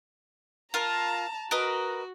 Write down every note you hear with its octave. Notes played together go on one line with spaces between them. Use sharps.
F4 A#4 A5 A#5
F#4 A#4 B4 D#5